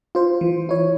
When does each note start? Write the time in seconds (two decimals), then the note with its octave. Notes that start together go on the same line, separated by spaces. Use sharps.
0.15 F4 C5
0.41 E3
0.69 E4 C#5